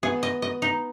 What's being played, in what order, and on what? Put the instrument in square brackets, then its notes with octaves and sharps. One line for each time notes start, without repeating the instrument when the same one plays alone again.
[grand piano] B3 [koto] G#4
[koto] D#5
D#5
D#4